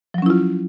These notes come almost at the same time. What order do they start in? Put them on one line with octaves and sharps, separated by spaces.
F3 F#3 C#4 E4 F4